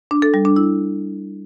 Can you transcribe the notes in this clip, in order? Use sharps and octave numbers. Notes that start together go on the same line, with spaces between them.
D4
A4
G3
D4
E4